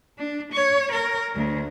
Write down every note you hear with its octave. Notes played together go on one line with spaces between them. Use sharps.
D4
C#5
A#4
D2